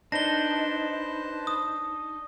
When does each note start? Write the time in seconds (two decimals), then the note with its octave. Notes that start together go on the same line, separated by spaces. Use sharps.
0.12 D4 D#4 B4 C5 A5 A#6 G7
1.47 D#6